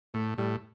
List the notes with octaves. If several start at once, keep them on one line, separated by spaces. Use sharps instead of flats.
A2 A3
A2 G3